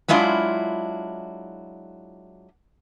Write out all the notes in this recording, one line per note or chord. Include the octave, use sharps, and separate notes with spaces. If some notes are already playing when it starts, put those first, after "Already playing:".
F#3 G#3 D4 E4 F4